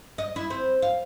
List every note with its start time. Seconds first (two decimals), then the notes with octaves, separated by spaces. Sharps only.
0.18 D#5
0.36 E4
0.50 C4
0.82 F5